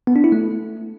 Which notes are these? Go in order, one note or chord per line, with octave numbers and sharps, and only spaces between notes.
B3
D4
E4
A3